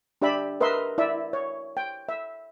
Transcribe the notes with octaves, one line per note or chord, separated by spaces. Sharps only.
D4 G4 D5 E5 B5
A#4 B4 D#5 E5 C6
E4 D5 E5
C#5
G5
E5